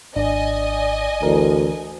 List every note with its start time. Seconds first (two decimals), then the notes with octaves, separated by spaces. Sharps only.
0.16 G#1 D4 D5 D#5 G#5
1.23 D2 E3 A#4